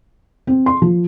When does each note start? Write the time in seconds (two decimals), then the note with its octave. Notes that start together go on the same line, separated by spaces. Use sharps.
0.47 C4
0.66 C6
0.82 F3